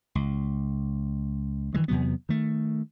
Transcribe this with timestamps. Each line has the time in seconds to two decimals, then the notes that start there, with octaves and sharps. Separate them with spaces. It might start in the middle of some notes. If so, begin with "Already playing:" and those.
0.15 C#2
1.74 G2 D#3 E3 G#3
1.88 E2 C3 F#3 B3
2.29 D#3 A3